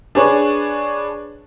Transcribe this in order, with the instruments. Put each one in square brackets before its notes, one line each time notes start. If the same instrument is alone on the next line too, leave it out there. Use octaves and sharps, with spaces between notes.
[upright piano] D4 G#4 B4 C#5